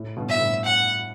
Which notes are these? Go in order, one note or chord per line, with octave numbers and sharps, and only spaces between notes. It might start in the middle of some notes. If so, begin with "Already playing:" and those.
Already playing: A2
G2 B2
E5
A2
G2 B2
F#5